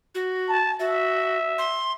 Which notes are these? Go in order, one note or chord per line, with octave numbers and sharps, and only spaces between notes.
F#4
A5
F#4 E5
C6